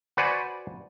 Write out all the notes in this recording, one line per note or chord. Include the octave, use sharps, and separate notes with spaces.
F#4 B4 C5 D5 F#5 G#5